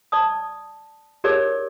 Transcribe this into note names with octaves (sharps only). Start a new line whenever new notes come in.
D5 A5 D#6
D#4 G4 G#4 A#4 C#5 D5